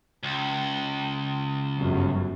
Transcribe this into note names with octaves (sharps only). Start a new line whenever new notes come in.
C#2
G1 F#2